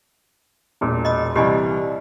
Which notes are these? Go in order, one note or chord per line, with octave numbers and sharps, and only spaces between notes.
E1 A#2
D#5 B5 D#6
C2 E3 G3 G4 D#5 G#5